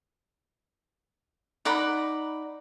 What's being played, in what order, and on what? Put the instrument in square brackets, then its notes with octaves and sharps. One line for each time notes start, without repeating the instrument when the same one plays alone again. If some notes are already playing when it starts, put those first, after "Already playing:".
[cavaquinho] D#4 D5 F#5 B5